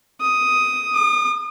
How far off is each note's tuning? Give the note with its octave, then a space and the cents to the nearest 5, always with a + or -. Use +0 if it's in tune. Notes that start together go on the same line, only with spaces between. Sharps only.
D#6 +5
D#6 -40